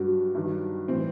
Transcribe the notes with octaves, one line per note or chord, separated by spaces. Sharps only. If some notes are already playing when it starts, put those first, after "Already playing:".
Already playing: G2 F#3 F#4
G2 D#3 F#3
A2 E3 C4